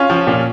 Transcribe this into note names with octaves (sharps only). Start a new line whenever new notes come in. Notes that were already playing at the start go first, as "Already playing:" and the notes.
Already playing: C#4 F4
F3
A#2